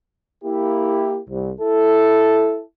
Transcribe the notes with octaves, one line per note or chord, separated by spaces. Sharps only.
A#3 E4 G4
C2
E4 A4